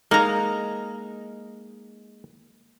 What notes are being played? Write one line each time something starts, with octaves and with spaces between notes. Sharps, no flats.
G#3 A#3 D#4 A#5